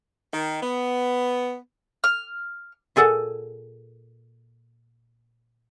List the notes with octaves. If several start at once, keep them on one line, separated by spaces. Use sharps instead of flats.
D#3
B3
F6
A#2 G#4 A4 F#5